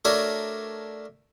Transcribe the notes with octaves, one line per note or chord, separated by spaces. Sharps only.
A3 D4 F#4 A#4 C#5 D5